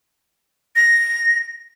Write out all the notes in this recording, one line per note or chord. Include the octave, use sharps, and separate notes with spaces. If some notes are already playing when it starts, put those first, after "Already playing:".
A#6